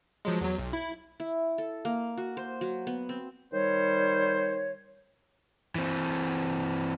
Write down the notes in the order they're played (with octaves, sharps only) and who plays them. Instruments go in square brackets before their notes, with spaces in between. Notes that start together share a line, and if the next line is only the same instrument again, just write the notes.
[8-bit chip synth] F3 F#3 G#3
E2 F#3
B1
E4
[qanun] E4
A4
A#3
F#4
C5
F#3
B3
C4
[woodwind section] D#3 G3 C5 C#5
[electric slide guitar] E3 C4